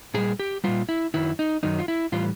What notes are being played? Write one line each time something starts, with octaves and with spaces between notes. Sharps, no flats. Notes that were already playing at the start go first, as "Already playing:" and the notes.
A#2 G3 G#4
G4
A#2 G3 F4
E4
F#2 D#3 F#3 E4
D#4
F#2 D#3 F#3 D#4
F4
E4
A2 E3 G3 F4